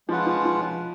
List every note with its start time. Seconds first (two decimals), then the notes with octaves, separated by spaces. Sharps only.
0.08 F3 G#3 C#4 F4 B4 F#5
0.27 F3
0.45 F3